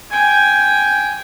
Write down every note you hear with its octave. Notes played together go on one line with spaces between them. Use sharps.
G5 G#5